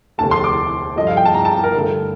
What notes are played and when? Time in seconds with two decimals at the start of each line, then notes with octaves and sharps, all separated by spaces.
0.18 F1 D#2 D3 A3 A5
0.31 C6
0.44 D6
0.96 G2 F3 A3 D#5
1.07 F5
1.17 G5
1.25 A5
1.34 A#5
1.45 A5
1.64 A#4
1.74 G2 D3 A3